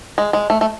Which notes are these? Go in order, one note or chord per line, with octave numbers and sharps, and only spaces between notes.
G#3
G#3
A3
A3